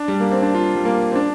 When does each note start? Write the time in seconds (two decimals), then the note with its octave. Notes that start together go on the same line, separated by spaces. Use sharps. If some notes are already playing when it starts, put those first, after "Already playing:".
Already playing: D4
0.08 G3
0.20 A#3
0.32 C4
0.42 D4
0.55 F4
0.75 G3
0.85 A#3
1.11 C4
1.15 D4